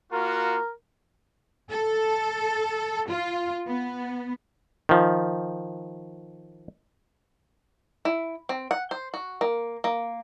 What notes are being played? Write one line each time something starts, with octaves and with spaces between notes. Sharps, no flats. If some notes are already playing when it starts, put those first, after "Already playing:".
A#3 F4 F#4 A#4
A4
F4
B3
D#3 F3
E4
C4
F#5
C5
F#4
A#3
A#3